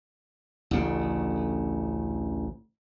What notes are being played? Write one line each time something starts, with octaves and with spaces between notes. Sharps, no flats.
A1 D2 C#3